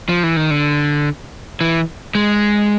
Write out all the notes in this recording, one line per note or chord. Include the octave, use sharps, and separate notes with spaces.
F3
E3
D#3
D3
E3
G#3